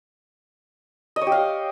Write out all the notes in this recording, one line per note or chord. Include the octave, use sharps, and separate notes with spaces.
D#5
C#5
G4
F5